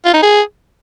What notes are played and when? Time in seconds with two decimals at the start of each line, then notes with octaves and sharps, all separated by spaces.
0.05 F4
0.14 D#4
0.22 G#4